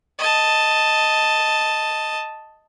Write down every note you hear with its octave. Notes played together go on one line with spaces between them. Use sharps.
D#5 A5